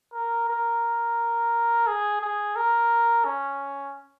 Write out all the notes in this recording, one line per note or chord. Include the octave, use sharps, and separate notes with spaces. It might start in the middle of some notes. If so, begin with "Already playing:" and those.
A#4
A#4
G#4
G#4
A#4
C#4